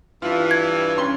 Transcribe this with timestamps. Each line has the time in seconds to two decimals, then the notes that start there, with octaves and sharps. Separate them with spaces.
0.22 G2 E3 F4
0.51 G#6
0.97 C#4 C6 G7